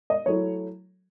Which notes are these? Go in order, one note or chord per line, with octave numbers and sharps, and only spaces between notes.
D#5
F#3 A3 E4 C#5